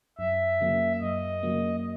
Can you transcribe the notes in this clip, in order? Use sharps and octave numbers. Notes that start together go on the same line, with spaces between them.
F#2 E5
C#3 F#3 A#3
F#2 D#5
C#3 F#3 A#3